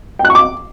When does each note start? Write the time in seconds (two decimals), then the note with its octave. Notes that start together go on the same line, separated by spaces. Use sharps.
0.19 G5
0.25 F#6
0.30 C#6
0.35 D6